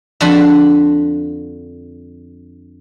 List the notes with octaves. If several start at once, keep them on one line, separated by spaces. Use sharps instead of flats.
F2 D3 D4 F4 F#4 B5